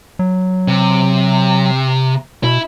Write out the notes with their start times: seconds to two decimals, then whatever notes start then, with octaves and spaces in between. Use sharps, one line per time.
0.19 F#3
0.68 C3
2.44 B2 E4